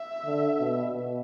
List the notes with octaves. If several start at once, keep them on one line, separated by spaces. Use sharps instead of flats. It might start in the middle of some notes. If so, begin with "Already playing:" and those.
Already playing: E5
D3
B2
B2